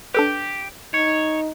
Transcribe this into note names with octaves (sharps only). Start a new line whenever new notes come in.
D4 G4 A4 B4
D#4 C#5